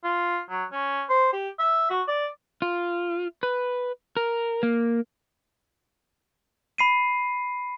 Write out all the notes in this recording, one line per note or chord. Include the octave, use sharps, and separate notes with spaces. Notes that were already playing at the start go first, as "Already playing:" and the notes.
F4
F#3
C#4
C5
G4
E5
F#4
D5
F4
B4
A#4
A#3
B5 C7 D#7